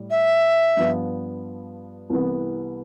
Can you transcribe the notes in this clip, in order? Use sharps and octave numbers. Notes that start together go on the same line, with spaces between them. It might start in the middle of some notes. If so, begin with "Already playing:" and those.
Already playing: A2 G3
E5
G2 F3 B3 F4
C2 C3 E3 B3